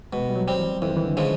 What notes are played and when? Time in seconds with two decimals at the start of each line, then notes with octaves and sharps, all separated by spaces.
0.13 B2 G#3
0.29 G3
0.36 F#3
0.48 G3 C4
0.59 E3
0.82 F2 E3
0.90 D#3
0.97 E3
1.05 D3
1.17 C#3 F3 G#3